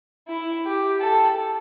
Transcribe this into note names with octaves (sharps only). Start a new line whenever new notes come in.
E4
G4
A4